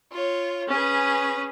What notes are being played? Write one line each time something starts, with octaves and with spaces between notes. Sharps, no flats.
F4 C#5
C#4 G#4 B4